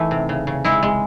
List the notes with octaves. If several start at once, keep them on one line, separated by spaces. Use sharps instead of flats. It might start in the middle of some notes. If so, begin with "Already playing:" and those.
Already playing: E3 A3 D#4
C3
C#3
C#3
G#3 E4
G#3